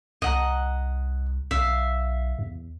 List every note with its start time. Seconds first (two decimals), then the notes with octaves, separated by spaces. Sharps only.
0.22 C2 D#5 F#5 A#5
1.51 B1 E5 F5
2.39 E2